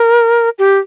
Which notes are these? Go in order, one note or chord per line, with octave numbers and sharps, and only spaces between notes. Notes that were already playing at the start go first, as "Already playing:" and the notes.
Already playing: A#4
G4